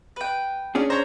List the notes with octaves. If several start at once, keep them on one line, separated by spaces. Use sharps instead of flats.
B4 G5
C#4 D4 G#4
C5 C#5 A#5